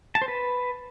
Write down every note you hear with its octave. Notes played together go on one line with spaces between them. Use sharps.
A5
C5
B4